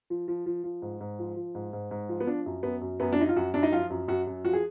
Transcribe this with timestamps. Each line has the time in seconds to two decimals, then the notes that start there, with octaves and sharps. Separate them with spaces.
0.10 F3
0.28 F3
0.46 F3
0.64 F3
0.82 G#2
1.00 G#2
1.19 F3
1.36 F3
1.55 G#2
1.73 G#2
1.91 G#2
2.09 F3
2.21 B3
2.27 F3 D4
2.46 F#2
2.63 F#2 B3
2.81 F#2
3.00 F#2 B3
3.13 D4
3.18 F3 D#4
3.29 F4
3.36 F#2 F#4
3.54 F#2 D4
3.63 D#4
3.72 F3 F4
3.90 F#2
4.08 F#2 F#4
4.27 F#2
4.45 F3 F#4
4.53 G#4